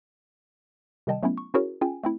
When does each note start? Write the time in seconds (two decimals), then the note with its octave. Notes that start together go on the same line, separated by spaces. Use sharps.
1.07 C3 D#3 G3 D#5 G5 A5
1.23 F#3 A3 B3 C#4 E4
1.38 C#6
1.54 C#4 E4 F#4 G#4 A#4 C#5
1.81 C#4 F4 G#4 G5 G#5
2.03 A3 C4 E4